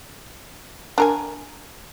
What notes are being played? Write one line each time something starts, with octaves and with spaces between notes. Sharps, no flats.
D4 A#4 G#5